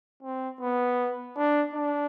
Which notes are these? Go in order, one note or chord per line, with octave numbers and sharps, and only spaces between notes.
C4
B3
D4
D4